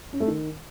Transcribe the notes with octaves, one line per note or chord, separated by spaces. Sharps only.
C#4
A3
D#3